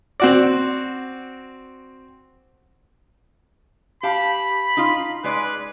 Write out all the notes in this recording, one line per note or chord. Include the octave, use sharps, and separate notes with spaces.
C4 F#4 D5
G4 F5 A5 B5
D#4 F4
G#3 G#4 B4 D5